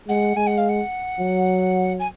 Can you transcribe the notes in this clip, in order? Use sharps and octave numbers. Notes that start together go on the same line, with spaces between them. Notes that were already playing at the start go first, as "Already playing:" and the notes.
G#3 F#5
G#3 G#5
F#5
F5
F#5
F#3
G#5